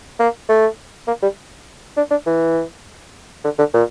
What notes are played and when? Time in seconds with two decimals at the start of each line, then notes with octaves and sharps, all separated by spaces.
0.19 A#3
0.49 A3
1.07 A#3
1.22 G3
1.97 D4
2.11 D4
2.26 E3
3.44 D3
3.59 D3
3.74 A#2